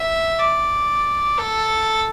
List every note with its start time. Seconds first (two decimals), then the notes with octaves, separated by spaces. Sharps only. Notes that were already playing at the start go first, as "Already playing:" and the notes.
Already playing: E5
0.39 D5
1.38 A4